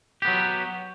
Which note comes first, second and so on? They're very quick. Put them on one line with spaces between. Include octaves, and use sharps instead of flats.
G4 B3 F#3